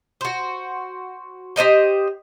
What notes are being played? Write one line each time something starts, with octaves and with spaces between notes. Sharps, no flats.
F#4 C5
G4 C5 D#5 G5